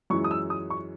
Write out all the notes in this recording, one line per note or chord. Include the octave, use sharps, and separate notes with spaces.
F#2 E3 G#3 C#6
D#6
E6
D#6
C#6